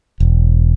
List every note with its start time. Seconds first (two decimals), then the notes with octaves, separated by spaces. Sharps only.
0.20 E1